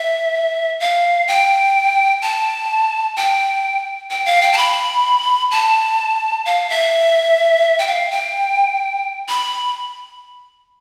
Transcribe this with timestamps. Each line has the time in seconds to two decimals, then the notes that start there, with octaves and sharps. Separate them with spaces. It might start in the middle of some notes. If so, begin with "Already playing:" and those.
Already playing: E5
0.80 F5
1.28 G5
2.22 A5
3.17 G5
4.11 G5
4.25 F5
4.42 G5
4.53 A5
4.57 B5
5.51 A5
6.46 F5
6.70 E5
7.79 G5
7.87 F5
8.11 G5
9.28 B5